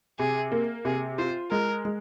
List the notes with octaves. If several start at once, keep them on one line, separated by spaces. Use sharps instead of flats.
C3 G#4
A#3
C3 G#4
F4 C5
G#3 A#4
G#3